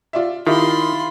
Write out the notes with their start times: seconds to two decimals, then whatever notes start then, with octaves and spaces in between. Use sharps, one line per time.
0.13 F4 D5 E5
0.47 D#3 E4 F4 G4 B5 C6